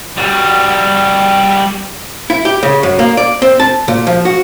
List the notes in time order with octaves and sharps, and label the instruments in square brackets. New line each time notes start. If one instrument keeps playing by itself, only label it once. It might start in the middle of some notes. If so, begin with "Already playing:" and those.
[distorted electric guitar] G3 F#4
[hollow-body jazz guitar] E4
G4
C#3
F#2
A#3
D5
C4
A5
A#2
F3
F#4